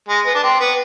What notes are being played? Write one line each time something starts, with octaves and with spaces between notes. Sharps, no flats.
G#3
B3
D4
C4
B3